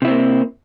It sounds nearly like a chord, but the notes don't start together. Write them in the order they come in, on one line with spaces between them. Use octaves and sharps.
C3 E4 C4 A#3